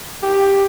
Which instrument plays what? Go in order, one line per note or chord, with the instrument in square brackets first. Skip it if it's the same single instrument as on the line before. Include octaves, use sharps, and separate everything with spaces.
[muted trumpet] G4